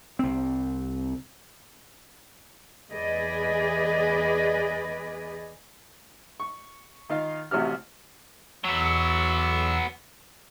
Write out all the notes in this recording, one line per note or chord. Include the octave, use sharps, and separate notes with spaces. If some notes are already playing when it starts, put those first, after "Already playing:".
C2 C4
E2 G#4 B4 D5 D#5
C#6
D#3 D#4 F4 F5
A1 C3 F#4 G4 F6
E2 F#3 B3 E6